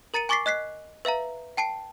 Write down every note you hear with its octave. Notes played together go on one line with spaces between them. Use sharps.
A#4 A#5 A6 C#7 D#7
G#5 C#6 D6 A6 B6 C7
D#5 F#6 B6 C7
B4 E5 F5 A#5
G5 A5 C7 D7